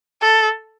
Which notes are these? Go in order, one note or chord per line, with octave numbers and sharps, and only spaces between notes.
A4